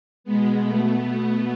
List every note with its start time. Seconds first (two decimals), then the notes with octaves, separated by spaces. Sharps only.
0.24 B2 G#3 B3
0.61 B2 A3
0.98 B2 A3 B3